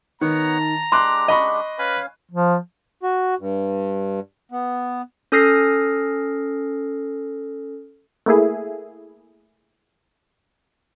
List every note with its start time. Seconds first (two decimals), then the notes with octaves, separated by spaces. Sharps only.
0.21 D#3 B3 C#5 F#5 A#5
0.60 A5
0.92 G#3 D4 G4 C6 D6 F#6
1.28 D#5 B5 C#6
1.79 C#4 B4 F5 G#5
2.31 F3
3.03 F#4
3.39 G2
4.52 B3
5.32 C#4 A4 D#6 F6 A#6 C7
8.26 A3 A#3 E4 G#4